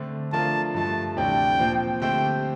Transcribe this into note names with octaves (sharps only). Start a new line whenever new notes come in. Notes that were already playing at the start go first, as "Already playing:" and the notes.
Already playing: D3 A3 C4
F3 A3 D4 F4 A#4 A5
G2 F3 A3 A5
D2 C3 E3 G3 D4 G5
A#2 F3 C4
D3 A3 C4 G4 C5 G5